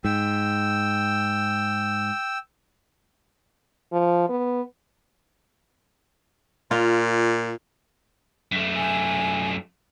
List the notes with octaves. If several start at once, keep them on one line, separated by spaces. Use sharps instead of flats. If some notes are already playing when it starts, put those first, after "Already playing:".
G#2 G5 E6
F3
B3
A#2 F4
F#2 A3
G#5